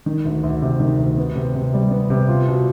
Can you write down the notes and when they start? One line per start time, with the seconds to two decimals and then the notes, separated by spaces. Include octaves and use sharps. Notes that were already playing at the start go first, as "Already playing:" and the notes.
0.06 D#3
0.25 D2
0.43 D2
0.62 C3
0.80 D#3
0.98 D2
1.17 B3
1.35 C3
1.55 C3
1.74 G3
1.91 B3
2.10 C3
2.29 F4
2.48 B2